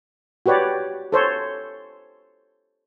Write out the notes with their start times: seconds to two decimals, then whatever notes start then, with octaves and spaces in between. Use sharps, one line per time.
0.46 F#4 G4 B4 C#5 D5
1.12 A4 C5 C#5